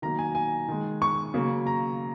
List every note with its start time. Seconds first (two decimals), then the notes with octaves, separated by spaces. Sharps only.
0.02 D#3 F#3 A#3 A#5
0.19 G#5
0.35 G#5
0.68 D#3 G#3
1.02 C#6
1.34 C#3 F#3 A#3
1.67 A#5